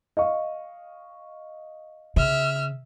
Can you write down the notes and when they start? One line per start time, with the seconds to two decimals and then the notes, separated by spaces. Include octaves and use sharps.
0.17 D#5 F5 C#6
2.16 C#3 E5 F6